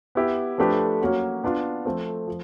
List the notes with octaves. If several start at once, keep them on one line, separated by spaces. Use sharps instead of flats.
B3 E4 G4
F3 A3 D4 G4 B4
F#3 A#3 C#4 F#4
B3 D4 F4
F3 A3 C4
F3